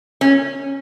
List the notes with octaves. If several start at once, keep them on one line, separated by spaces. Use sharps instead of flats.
C#4